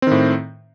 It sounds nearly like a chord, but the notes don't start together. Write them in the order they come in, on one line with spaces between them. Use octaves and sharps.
C4 D#3 A2